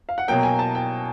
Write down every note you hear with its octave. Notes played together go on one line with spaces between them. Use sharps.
F5
F#5
B2 F#3 A#3 G5
G#5
A5
G5